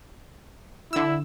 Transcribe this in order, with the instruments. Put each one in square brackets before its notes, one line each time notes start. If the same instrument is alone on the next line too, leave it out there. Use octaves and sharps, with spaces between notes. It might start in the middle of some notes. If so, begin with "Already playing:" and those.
[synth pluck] D3 E6 [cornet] E4